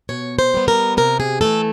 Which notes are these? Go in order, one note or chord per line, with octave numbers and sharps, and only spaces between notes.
B2 C#5
C5
G3 B3
A#4
C3 A#4
G#4
E3 A3 A4